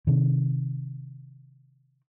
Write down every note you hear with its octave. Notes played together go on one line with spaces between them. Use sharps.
C3 D#3